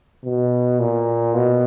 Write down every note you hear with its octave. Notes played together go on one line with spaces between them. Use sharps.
B2
A#2
B2